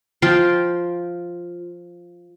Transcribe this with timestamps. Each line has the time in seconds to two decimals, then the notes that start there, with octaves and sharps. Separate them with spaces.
0.22 F3 F4 G5 C6